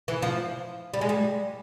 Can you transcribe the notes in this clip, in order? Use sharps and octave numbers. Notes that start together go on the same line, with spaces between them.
E3
F3
G3
G#3
G3